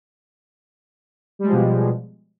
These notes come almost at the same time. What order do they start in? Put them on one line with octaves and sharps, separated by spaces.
G3 G#3 F3 B2